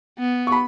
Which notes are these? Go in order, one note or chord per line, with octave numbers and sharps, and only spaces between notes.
B3
C#6
B5